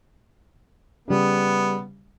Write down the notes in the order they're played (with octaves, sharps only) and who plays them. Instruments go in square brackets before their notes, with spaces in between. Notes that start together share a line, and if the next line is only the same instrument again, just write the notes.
[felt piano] C#3 G3 [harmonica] B3